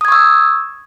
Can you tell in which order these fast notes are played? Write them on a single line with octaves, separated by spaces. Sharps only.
D#6 G#6 C#6 E6